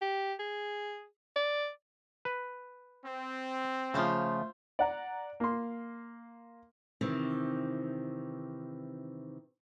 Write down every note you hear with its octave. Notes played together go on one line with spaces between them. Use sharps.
G4
G#4
D5
B4
C4
C#3 F3 A3 F4 C5 E5
D5 F#5 A#5
A#3 C6
C3 D#3 E3 C4